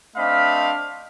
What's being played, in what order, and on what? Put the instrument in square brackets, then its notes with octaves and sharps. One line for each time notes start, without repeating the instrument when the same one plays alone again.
[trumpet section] A3 C4 D4 D#5 F5 B5